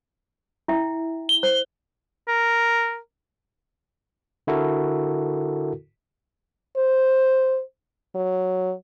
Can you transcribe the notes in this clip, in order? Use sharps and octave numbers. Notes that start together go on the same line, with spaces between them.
E4 E5 G5
G7
C5
A#4
D3 E4 F#4 A4 A#4
C5
F#3